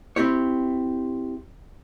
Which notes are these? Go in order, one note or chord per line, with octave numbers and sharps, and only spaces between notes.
C4 E4 G4 C#5